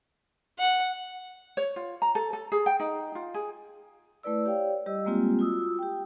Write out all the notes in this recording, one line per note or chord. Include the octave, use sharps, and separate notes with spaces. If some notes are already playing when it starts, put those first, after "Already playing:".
F#5
C#5
F4
A#5
A4
A4
G#4
G5
D#4
F4
G#4
A3 E4 B4 D5 E6
G4 C#5 D5 F5 G5
G3 G4 D#5 E6
G3 G#3 A#3 C4 F4 G4
F4 F#4 D#6 E6
G4 G5